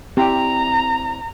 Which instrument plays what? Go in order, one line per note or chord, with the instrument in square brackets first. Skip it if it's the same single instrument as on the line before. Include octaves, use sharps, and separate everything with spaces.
[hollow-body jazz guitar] C4 E4 D5 [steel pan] G4 [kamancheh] A#5